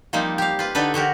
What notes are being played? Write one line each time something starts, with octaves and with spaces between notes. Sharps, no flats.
F3 G3 A#3 C4 D#4
G4 F5
F4 B4
D3 D4 D#4 A4 B4
D3 F#4 G4 A#4